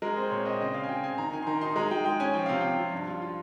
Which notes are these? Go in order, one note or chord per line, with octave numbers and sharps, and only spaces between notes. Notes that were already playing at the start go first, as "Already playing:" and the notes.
G#3 A#4
C4 C5
A#2 C#5
C4 D#5
C#3 D#5
C#3 F5
G#5
C#3 G5
C4 G#5
D#3 A#5
D#3 G#5
C6
D#3 A#5
D#4 C6
G#3 A#5
G#3 G5
G#3 G5
C#4 G#5
F3 G5
C3 F5
C3 G5
F3
G2
F4
F4